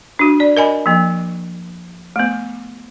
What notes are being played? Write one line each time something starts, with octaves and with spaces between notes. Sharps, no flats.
D4 F#4
D5
A#4 D#5 G#5 B5
F3 A#3
A3 B3